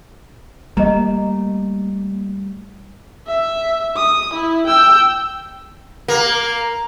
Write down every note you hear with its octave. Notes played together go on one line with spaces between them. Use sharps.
G3 A3 A#3 D#5 A#5
E5
D#6
E4
G5 E6
A#3